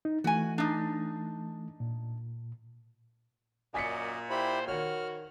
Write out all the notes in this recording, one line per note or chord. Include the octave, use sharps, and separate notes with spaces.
D#4
E3 A3 F#4 G#5
D4 D#4
A#2
F#2 A#2 D5 D#5 G#5 B6 C#7
E4 G4 C5 B5
D#3 F#4 C#5 F6